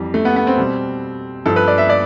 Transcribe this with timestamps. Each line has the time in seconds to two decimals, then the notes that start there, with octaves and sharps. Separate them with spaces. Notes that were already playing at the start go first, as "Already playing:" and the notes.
Already playing: F2 E3 G3
0.14 A3
0.25 B3
0.36 B3
0.47 C4
0.58 B2 G3
1.46 G2 F3 A4
1.56 B4
1.68 D5
1.78 E5
1.90 D5